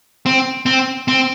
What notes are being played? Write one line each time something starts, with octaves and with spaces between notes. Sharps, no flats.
C4
C4
C4